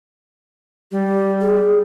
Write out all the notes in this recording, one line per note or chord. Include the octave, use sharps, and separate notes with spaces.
G3 G4
G#4